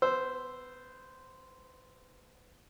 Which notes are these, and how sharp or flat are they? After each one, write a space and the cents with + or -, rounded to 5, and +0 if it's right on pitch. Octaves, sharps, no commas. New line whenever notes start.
B3 +20 C5 -5 E6 +0